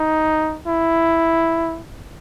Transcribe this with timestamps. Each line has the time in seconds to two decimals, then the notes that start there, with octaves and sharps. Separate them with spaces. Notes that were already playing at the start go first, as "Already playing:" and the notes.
Already playing: D#4
0.67 E4